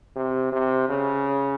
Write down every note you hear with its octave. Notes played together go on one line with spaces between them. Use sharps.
C3
C3
C#3